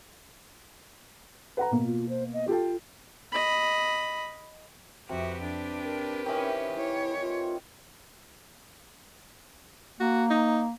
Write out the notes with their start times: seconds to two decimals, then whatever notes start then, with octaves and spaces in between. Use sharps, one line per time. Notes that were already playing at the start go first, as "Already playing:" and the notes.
1.57 B4 F#5 A#5
1.71 B2 A#3
1.85 F4
2.09 C5
2.33 D#5
2.48 F4 G4 A4 G5
3.32 D#5 B5
5.09 F2 C3 F#4 G4 B4
5.42 D4
5.84 A#4
6.26 D#3 E3 C4 C#4
6.77 E4 C#5
7.21 F4
10.00 A#3 F#4
10.30 D#4